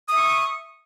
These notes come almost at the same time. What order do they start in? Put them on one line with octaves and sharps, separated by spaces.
D#6 E5 C#6